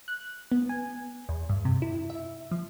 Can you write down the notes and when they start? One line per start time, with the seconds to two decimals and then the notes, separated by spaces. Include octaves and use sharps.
0.08 F#6
0.52 B3
0.69 G#5
1.29 E2
1.50 G2
1.65 C3
1.82 E4
2.10 E5
2.51 F3